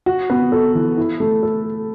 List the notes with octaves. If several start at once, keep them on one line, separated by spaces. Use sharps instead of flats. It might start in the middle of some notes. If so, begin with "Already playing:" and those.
F#4
B3
A4
E3
E4
A3
A4